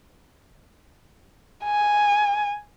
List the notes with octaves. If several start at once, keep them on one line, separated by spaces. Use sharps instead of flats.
G#5